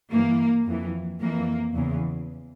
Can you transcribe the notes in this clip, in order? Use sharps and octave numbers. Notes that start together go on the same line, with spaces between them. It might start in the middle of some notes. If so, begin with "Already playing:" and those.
G2 E3 A#3
F2 E3
F2 E3 A#3
E2 C#3 E3